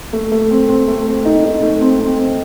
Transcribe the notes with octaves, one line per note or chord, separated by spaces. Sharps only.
A3
A3
C4
C4
A3
C4
D#4
D#4
A3
C4
C4
C4